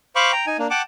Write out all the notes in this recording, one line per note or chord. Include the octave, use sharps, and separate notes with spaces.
C5 F5 B5 C#6 D6
G5 A#5
D#4 G#5
A#3 D4
F#5 G5 A5 D6